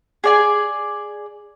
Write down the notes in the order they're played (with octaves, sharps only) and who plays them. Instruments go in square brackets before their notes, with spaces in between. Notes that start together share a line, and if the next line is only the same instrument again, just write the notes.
[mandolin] G#4 D5 G#5